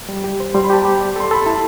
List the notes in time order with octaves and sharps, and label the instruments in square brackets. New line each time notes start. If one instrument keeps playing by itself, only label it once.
[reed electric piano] G3
G4
C5
[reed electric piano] G3 [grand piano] C6
[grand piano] B5
[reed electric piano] G4 [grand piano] A5
[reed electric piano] G4 [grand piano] B5
[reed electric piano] D5
[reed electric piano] A4 [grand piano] C6
[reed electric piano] A4 [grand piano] B5
[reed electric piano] E4 [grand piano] A5